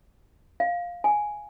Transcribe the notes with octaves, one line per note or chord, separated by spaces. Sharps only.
F5
G#5